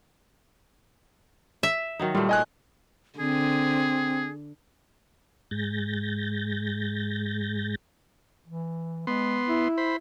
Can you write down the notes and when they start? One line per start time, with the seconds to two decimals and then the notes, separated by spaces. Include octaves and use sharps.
1.63 E5
1.99 D#3 F#3 D#4
2.15 A#2 G3 A3
2.29 D#5 G#5 F#6
3.19 D3 C4 G#4
5.51 G#2 G#3 G6 A6 A#6
8.47 E3
9.07 G#3 B3 C6
9.48 E4
9.78 C5 B5